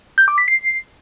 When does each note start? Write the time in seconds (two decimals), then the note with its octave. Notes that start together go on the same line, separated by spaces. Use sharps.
0.18 G6
0.28 D6
0.38 B6
0.48 C7